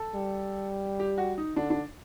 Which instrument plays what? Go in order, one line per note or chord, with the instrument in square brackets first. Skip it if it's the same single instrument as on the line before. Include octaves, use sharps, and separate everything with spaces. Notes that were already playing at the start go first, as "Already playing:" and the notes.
Already playing: [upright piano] A4
[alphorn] G3
[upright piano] G4
F#4
D#4
[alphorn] D3 [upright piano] D4
[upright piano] D4